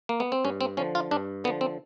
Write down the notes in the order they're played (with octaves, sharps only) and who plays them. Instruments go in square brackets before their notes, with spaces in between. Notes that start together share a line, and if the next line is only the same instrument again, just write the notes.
[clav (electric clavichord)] A#3
B3
C4
G2 C#4
C4
D3 F3 C#4
F4
G2 D4
D3 B3
F3
C4